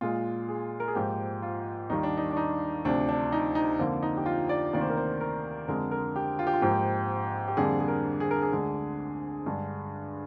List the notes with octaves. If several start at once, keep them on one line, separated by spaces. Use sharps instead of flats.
A#2 G#3 F4
G#4
A#4
G#4
G#2 F3 A#3 G4
F4
D#2 D#3 G3 A#3 D#4
D4
D#4
D4
D#4
D2 C3 F3 D4
D4
D#4
D#4
F2 D3 F3 A#3
D#4
G4
F4
D5
D2 C3 D#3 A#3 D5
C5
A#4
C5
A#4
F2 D3 G#3 A#4
A#4
G4
F4
G4
F4
G#2 F3 A#3 G4
G4
F2 D3 G3 A#3 G#4
G#4
A#4
G#4
A#4
G#4
D2 D3 G#3
G2 D3 G#3